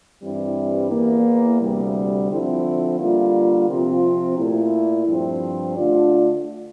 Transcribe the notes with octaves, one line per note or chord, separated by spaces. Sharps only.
G2 E3 G3 C4 E4
E2 E3 A#3
D2 C3 G3
D3 F3 C4 E4
D3 G3 A#3 F4
C3 F3 C4 F4
A#2 A3 E4
G2 F3 C4
D3 A3 D4 F4